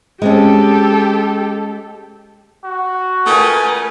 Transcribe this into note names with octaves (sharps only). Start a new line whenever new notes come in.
G#3 C4 C#4 G4 A4
F#4
A3 G#4 A#4 B4 G5 G#5